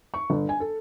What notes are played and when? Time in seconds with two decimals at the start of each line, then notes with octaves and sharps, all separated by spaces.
0.14 C#6
0.30 G1
0.49 G#5
0.60 A4